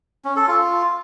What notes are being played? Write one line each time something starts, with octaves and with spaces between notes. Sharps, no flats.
C#4
A4
F4